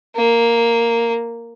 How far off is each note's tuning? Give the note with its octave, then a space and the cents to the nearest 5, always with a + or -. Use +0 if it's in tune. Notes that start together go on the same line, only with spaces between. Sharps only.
A#3 -5